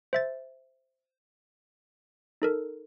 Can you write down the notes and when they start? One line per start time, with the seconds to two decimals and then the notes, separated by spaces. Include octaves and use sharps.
0.13 C5 E5 A6
2.42 D#4 A4 A#4